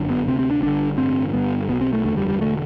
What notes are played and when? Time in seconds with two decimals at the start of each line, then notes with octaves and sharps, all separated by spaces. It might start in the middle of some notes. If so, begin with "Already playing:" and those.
Already playing: G1 F#2 D3
0.10 B3
0.27 D2 C3 C4
0.39 C4
0.51 D4
0.62 G1 G2 D3 D4
0.98 A1 G2 D3 C4
1.33 G1 G2 D3 B3
1.69 B1 B3
1.73 B2
1.81 C4
1.93 A3
2.04 F#1 E2 D3 A3
2.17 G3
2.28 G3
2.40 E1 D3 A3